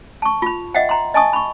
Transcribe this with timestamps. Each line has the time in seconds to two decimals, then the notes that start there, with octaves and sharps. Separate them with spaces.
0.22 A5 C#6
0.42 F4 B5
0.75 D#5 E5 F#5 G5
0.89 G5 A#5 C6
1.14 D#5 G#5 A5 C#6 D#6
1.33 B5 C#6